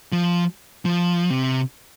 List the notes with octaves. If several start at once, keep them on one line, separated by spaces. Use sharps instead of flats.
F3
F3
C3